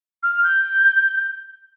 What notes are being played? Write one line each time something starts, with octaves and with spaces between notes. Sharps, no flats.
F6
G6